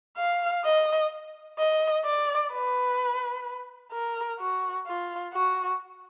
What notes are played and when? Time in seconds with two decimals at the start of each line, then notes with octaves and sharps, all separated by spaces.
0.17 F5
0.64 D#5
1.58 D#5
2.05 D5
2.52 B4
3.92 A#4
4.39 F#4
4.87 F4
5.33 F#4